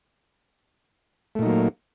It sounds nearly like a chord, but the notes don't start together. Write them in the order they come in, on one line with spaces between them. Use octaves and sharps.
A3 A#2 D#4 F#3 A#3